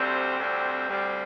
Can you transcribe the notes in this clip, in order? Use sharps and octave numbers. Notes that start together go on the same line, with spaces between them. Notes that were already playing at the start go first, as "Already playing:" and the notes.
Already playing: D2 C3 G3 C4
D2 C3 G3 C4
D2 C3 G3 C4